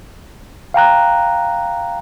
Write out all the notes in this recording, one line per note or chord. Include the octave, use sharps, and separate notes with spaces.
F5 G5 A#5 F#6